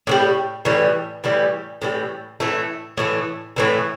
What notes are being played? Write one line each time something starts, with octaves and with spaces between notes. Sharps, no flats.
A2 E3 G3
A2 E3 G3
A2 E3 G3
A2 E3 G3
A2 E3 A3
A2 E3 A3
A2 E3 A3